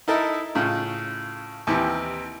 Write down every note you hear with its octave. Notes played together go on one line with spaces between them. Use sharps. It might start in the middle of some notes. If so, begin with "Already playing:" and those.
D#4 E4 A4 A#4 E5
A2 C#3 F4
D#2 C3 D#3 E3